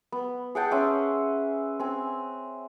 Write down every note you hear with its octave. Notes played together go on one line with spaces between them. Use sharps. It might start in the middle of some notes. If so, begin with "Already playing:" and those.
B3
G#4 F#5 G5 A5
C#4 E5 G#5 C6
C4 G#5